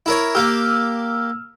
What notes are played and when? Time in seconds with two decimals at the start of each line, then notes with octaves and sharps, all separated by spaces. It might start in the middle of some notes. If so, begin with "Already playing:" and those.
0.06 E4 A#4 C#5
0.35 A#3 G4 E6 F6